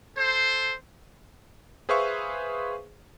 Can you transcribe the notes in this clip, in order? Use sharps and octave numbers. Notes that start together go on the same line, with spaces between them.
A4 C5
G#4 B4 C5 E5 F5 C#6